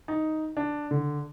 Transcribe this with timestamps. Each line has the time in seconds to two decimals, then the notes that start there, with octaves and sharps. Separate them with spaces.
0.08 D#4
0.57 D4
0.91 D3